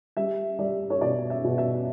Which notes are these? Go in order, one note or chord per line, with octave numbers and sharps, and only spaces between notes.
G3 E5
G3 D5
C#5
B2 D5
E5
B2
E5